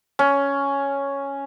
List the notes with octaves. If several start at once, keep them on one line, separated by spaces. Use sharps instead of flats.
C#4